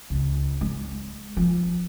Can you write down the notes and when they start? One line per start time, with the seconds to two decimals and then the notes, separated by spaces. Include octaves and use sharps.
0.10 C#2
0.61 G#3
1.37 F3